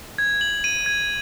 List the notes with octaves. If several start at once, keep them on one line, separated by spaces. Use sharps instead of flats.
G#6
F#7
D#7
G#6